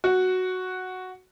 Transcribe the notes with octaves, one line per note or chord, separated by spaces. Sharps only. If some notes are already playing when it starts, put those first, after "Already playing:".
F#4